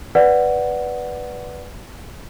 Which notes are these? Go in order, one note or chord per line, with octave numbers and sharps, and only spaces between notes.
B4 D5 F#5